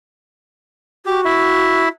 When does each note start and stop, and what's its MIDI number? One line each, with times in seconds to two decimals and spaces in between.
1.06 1.86 66
1.06 1.21 67
1.25 1.89 64
1.25 1.89 76